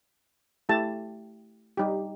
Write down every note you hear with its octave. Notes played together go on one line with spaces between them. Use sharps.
A3 E4 G4 A5
G3 D#4 G4